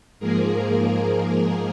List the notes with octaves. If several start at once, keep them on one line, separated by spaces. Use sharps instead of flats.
G#2 F3 A#3 G#4 A#4